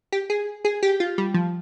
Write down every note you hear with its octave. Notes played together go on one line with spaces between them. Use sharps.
G4
G#4
G#4
G4
F4
G3
F3